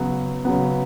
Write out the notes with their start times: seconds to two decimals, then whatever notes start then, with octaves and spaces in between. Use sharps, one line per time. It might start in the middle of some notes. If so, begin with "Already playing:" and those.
Already playing: C#3 F#3 B3
0.45 C#3 F#3 B3